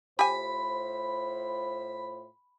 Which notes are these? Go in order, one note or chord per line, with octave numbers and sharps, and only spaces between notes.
A2 F4 G4 C5 G#5 B5